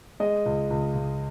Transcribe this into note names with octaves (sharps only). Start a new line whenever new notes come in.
G#3 D#5
C#2
C#2
C#2